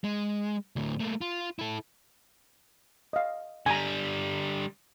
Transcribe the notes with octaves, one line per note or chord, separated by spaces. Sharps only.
G#3
D2 A2
A3 A#3
F4
E4 A4
D#5 F5
D3 G3 G#5 A#5